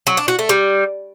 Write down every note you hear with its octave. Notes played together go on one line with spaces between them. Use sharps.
F#3
D4
F#4
A3
G3